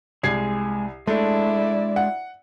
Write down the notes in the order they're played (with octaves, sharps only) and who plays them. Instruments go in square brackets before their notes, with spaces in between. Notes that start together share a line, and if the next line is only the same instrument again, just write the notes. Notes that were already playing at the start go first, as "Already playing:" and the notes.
[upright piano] C2 G#6 C7 [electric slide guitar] G#3 G#4
[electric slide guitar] G#3 D4 [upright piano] A3 [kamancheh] E4 D5
[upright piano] F#5